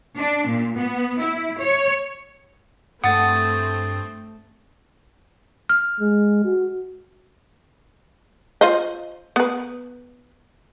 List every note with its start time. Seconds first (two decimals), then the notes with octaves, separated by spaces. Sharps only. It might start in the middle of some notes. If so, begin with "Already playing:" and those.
0.18 D4
0.47 A#2
0.77 B3
1.20 E4
1.60 C#5
3.04 G2 A3 C4 F#5 D#6 A6
5.69 F6
6.00 G#3
6.45 F#4
8.61 F4 C5 D#5
9.36 B3 B4